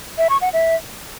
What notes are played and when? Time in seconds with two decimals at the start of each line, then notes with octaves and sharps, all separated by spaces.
0.18 E5
0.30 C#6
0.41 F#5
0.53 E5